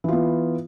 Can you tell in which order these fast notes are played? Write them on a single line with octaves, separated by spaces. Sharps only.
E3 F4 B3